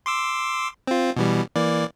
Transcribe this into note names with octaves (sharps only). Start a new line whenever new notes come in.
C6 D6 E6
C4 F4
B2 E3 G3
E3 A#3 D5